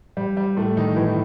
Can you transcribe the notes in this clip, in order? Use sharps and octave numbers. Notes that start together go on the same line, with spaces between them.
G3
G3
A2 A3
D#3 D#4
E3 E4